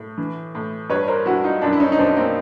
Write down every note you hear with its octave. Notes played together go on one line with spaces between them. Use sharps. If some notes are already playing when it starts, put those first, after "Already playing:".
Already playing: A2
E3
A2
G2 B4 C#5
A#4 C5
G2 E4 F#4
D#4 F4
F#2 D4 E4
E4
C#4 D#4
D#4
F#2 C4 D4
A#3 C4